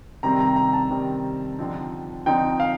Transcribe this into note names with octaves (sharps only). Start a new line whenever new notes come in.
C3 D#3 G3 C4 A#5
A#5
A#5
A5
C3 D#3 G3 C4
D3 F3 C4 D#4
D3 F3 C4 D#4 G5
F5